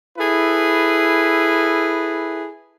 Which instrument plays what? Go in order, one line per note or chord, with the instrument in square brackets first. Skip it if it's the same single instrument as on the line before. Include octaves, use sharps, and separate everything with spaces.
[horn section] E4 G#4 A4 B4